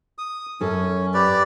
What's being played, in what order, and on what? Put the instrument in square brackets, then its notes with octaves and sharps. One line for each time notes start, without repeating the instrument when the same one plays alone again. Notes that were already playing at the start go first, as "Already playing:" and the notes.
[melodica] D#6
[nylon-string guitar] F#2 A4 [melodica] C#4
[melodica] G4 B4 D5